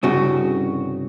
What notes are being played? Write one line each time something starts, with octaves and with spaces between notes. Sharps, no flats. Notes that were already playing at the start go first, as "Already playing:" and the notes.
C2 G2 C#3 F#4